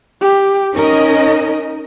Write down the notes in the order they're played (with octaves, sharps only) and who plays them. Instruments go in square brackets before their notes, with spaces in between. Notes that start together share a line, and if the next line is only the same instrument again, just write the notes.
[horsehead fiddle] G4
[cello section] C#4 A#4 D#5 [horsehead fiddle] D#4